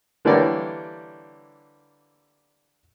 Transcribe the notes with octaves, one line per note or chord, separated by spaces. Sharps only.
D3 E3 G3 A#3 C#5 D5